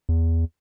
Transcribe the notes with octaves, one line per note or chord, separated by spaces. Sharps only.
E2